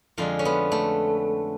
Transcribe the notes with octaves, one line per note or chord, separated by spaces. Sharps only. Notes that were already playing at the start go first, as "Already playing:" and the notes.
F2 D3 G#3 F4
C#4
B3
A3